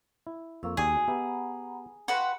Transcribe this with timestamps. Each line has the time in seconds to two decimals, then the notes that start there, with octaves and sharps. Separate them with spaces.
0.27 E4
0.63 F2 A#3 F5 C#6 E6
0.77 D#2 F#4 G#4 D5 G5 G#5
1.08 B3 G4 E5 F#5 A#5 B5
2.08 F#4 B4 F5 G5 C6